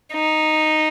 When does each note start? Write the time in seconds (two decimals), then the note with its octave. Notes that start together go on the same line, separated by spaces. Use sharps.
0.13 D#4